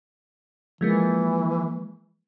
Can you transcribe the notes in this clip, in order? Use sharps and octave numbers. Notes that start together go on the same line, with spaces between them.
E3 F3 G#3 A#3